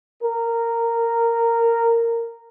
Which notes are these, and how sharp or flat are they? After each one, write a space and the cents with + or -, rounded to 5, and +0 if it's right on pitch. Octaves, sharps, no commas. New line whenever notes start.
A#4 -10